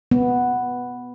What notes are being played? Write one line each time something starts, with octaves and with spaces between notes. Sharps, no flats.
B3